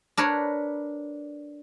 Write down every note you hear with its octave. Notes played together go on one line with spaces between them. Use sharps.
D4 A#4 B4 C#5